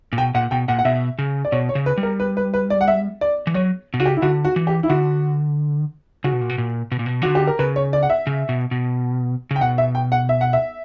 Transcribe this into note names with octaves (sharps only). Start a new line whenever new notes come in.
A#2
B2 G5
A#2 F#5
B2 G5
A#2 F#5
F#5
B2 E5
C#3
D5
B2 C#5
C#5
C#3
B4
G3
A#4
B4
B4
B4
D5
F#5
E5
D5
E3
F#3 C#5
B2
C#3 F#4
G4
E4
D3 F#4
F#4
E3
G4
E4
D3 F#4
C#3 F#4
B2
A#2
B2
A#2
B2
A#2
B2
D3 E3 F#4
G4
A#4
C#3 B4
C#5
D5
F#5
E5
C#3
B2
B2
C#3
G5
B2 F#5
E5
G5
F#5
E5
F#5
E5